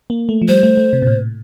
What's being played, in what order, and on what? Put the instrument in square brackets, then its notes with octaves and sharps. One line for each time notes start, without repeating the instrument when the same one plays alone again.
[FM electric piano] A#3
A3
F3
[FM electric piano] G3 [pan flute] C5
[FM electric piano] A3
A3
C3
A#2
A2